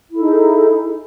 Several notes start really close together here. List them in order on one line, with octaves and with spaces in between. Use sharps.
E4 A4 D#4 G#4